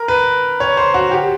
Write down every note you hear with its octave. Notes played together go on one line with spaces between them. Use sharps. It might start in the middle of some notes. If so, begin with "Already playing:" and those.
Already playing: A#4
B4
C#5
C5
F#4
G4